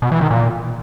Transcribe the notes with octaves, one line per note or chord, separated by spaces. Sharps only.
B2
E3
D#3
A#2